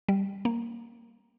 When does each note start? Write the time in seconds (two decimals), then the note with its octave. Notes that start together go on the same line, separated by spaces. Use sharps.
0.09 G3
0.45 A#3